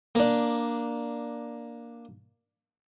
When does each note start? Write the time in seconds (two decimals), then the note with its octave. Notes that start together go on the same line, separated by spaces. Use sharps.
0.15 A#3 D4